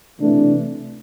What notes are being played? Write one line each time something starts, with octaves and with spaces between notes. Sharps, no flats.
C3 E3 A3 D4